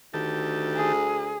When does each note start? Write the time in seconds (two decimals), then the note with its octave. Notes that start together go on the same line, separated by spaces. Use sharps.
0.14 D2 D#3 G4 A5
0.75 G#4